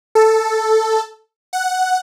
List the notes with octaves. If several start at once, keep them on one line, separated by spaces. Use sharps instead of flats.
A4
F#5